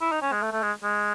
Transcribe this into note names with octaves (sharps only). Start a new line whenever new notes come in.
E4
D#4
C#4
G#3
A3
A3
G#3
G#3